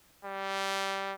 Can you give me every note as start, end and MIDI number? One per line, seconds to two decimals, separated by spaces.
0.24 1.14 55